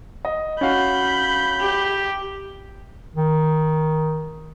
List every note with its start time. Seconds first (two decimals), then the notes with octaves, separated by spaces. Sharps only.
0.25 D#5
0.61 C#4 F#4 F5 B5 G6
1.61 G4
3.16 D#3